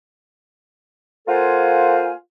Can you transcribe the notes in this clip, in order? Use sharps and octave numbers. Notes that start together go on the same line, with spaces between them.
A#3 F4 A4 C5 F#5 G#5